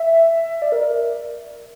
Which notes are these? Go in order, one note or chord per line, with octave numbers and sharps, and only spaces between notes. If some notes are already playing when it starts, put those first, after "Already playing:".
Already playing: E5
D5
A#4